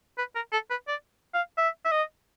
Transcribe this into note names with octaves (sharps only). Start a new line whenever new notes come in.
B4
A#4
A4
B4
D5
F5
E5
E5
D#5